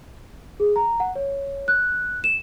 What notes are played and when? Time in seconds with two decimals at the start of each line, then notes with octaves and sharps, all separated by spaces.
0.60 G#4
0.76 A#5
1.00 F#5
1.16 C#5
1.68 F#6
2.24 E7